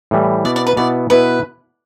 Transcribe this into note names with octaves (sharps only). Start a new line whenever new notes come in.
A2 E3 G3
B2 B3 E4 D5
D5
B4
B2 B3 E4 D5
B2 B3 E4 B4